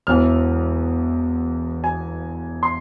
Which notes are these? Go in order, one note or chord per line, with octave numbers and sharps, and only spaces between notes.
E1 E2 E3 F6
G#5
C6